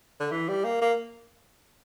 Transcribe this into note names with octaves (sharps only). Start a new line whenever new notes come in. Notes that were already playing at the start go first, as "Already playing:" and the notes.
D3
E3
G3
A#3
A#3